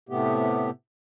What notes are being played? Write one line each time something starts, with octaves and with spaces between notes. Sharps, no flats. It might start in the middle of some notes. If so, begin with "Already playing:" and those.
A2 C3 A3 B3 G4